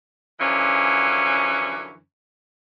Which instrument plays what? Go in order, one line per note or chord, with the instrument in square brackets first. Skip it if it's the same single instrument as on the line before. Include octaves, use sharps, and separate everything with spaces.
[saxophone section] F#2 D3 E3 F3 C#4